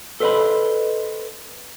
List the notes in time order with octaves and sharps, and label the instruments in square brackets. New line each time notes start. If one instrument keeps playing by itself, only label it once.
[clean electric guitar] A4 B4 C5 D5 D#5 B5